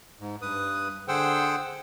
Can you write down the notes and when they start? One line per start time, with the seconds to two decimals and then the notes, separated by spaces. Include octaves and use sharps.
0.20 G#2
0.42 G2 B4 D#6
1.08 D3 G#4 C5 F#5 G5 E6